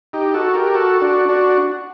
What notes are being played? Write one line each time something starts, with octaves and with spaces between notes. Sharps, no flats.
D#4 G4
F#4 A4
G4 A#4
F#4 A4
D4 F#4
D4 F#4